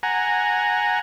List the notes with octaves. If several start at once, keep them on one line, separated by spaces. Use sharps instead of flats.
F#5 G#5 A#5